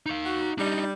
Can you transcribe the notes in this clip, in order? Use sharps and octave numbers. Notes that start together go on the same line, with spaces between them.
D#4 F5
F#4
G3 D4 D#4